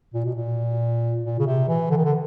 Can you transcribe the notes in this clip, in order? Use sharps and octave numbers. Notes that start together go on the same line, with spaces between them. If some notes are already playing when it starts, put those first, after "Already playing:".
A#2
B2
A#2
A#2
C#3
C3
E3
D3
D#3
D3